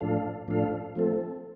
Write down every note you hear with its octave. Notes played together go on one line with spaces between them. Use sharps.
A2 F3 D4 A4 F5
A2 F3 D4 A4 F5
F3 A3 C4 A4